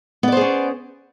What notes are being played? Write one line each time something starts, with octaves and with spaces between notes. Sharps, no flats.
B3 C#4 G#4 C5 D5